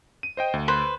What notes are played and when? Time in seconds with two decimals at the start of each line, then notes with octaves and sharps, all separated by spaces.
0.23 D#7
0.37 C5 D#5 G5
0.53 D2
0.68 B4 C5